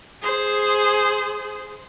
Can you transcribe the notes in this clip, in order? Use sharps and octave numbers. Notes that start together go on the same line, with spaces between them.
G#4 C5